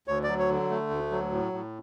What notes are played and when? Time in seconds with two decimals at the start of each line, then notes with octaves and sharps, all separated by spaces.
0.08 D2 C#5
0.23 F#3 D5
0.39 C#5
0.49 D3
0.70 A3
0.90 D2
1.12 F#3
1.32 A2
1.52 A2